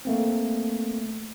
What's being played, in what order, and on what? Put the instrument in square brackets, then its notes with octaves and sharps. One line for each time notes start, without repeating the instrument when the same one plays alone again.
[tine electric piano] A3 A#3 C4